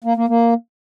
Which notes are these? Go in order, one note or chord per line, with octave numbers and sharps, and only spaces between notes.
A#3
A#3
A#3